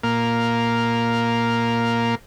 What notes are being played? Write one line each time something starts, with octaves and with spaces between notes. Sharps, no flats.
A#2 A#3 F5